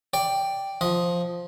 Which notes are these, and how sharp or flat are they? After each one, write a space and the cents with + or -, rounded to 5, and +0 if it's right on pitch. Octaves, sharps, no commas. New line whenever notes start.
D5 +0 G5 +0
F3 +0 D#5 +0